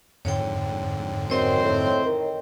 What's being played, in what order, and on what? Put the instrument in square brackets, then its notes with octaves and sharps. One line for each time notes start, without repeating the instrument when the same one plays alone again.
[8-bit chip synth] F2 G#2 D3 [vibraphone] C#5 G5
[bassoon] F#2 [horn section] C4 C5 [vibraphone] C#5 D#5 G5
[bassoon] A2
D#3